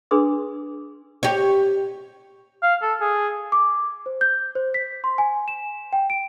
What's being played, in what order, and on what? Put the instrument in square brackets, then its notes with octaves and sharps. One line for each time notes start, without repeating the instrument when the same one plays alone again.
[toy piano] D4 G#4 B4 C6 D#6
[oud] G4 C#5
[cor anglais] F5
A4
G#4
[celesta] D6
C5
G6
C5
B6
C6
G#5
E7
G5
D7